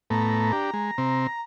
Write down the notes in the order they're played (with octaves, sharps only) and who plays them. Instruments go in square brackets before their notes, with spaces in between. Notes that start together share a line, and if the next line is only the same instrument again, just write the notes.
[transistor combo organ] A2 A3 B3 [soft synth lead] A#5
[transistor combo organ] D4 G4
G#3
C3 C4